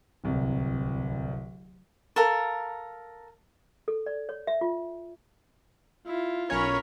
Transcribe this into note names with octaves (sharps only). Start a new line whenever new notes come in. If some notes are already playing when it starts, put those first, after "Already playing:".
D1 C2
A4 A#4 F5
A4
D5
C#5
E5
F4
E4 F4
B1 C#4 A#4 C#5 B5